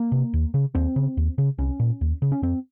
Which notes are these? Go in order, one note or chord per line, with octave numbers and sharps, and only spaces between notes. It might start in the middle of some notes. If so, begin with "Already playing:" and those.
Already playing: A#3
C3
D#2
C#3
D#2 C4
C#3
D#2
C#3
C2 C#4
A#2
D#2
C#3
C#4
F2 C4